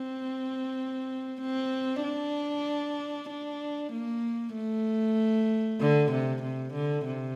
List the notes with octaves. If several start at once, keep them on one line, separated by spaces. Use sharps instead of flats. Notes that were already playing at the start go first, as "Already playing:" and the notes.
Already playing: C4
C4
D4
D4
A#3
A3
D3
C3
C3
D3
C3